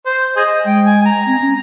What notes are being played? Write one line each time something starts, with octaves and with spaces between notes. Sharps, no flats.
C5
G#4 C5 D#5
G#3 G5
G#5
G#5
A#5
C4
C#4